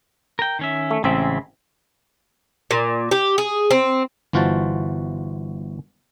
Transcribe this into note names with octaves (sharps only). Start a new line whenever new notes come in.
A#4 G5
D#3 C#4 E5
A3
A1 C#3 G#3 C4 E5
A#2
G4
G#4
C4
G1 E3 F4 F#4 C5 A5